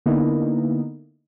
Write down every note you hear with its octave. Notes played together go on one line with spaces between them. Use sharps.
D3 A#3 B3 D#4 E4